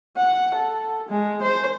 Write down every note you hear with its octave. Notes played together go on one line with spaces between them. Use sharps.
F#5
A4
G#3
C5